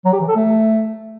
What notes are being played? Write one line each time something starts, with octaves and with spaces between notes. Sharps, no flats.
F#3
G4
E3
A4
A3